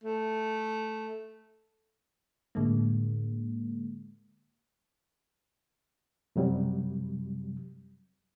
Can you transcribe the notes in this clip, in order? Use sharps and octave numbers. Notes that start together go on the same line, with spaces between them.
A3
A2 D3 G#3 A#3
F#2 C3 F#3 G3